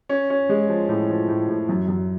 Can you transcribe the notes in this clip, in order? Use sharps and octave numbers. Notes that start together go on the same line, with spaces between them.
C#4
C#4
G#3
F3
A2
F3
A2
A2
F#2
F#2